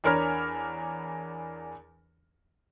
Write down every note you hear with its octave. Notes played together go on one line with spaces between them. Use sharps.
E2 D4 A#4 C#5 B5 F6